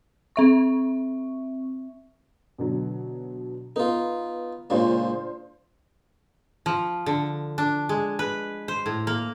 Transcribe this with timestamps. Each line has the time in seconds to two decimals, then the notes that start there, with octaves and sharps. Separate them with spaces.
0.36 C4 E5 C#6
2.58 B2 D3 F#3
3.76 B3 D#4 F4
4.70 C#2 A#2 C#3 D4 F4 C5
6.66 F3
7.06 D3
7.58 D4
7.89 G#3
8.19 B4
8.68 C5
8.86 A2
9.07 A#3